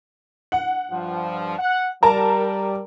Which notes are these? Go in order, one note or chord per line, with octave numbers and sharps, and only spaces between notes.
F#5
G2 F3
F#5
G3 A#4 A5 A#5